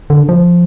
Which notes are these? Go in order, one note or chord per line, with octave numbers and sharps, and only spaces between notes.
D3
F3